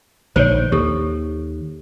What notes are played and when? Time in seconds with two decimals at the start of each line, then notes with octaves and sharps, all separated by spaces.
0.36 A#1 D3 D#3 C5 C#5
0.72 D#2 G4 A4